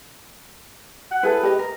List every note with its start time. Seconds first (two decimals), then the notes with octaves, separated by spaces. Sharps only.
1.11 F#5
1.23 E4 G#4 A4 B4
1.43 G4 D#5
1.59 A#4